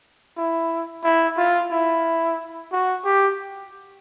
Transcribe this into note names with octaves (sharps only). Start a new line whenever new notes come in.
E4
E4
F4
E4
F#4
G4